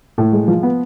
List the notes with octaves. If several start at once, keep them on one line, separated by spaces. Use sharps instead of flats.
A2
G#3
F3
B3